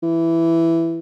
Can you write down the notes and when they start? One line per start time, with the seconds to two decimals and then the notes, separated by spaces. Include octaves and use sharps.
0.03 E3